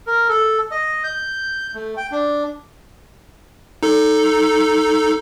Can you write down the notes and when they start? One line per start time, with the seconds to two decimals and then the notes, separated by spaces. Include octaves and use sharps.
0.07 A#4
0.29 A4
0.71 D#5
1.04 G6
1.74 A3
1.97 G5
2.12 D4
3.83 D#4 A4